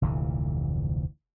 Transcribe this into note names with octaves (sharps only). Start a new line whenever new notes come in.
F1 D2 A#2 E3